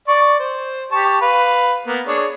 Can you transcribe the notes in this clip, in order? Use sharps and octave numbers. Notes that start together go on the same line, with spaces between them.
D5 C#6
C5
G4 A5 C#6
B4 F5
A#3 B3
D4 G#4 C#5